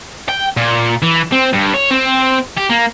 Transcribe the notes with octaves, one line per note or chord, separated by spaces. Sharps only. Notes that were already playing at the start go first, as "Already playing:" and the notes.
G5
A#2
E3
C4
G2
C#5
C4
G4
A#3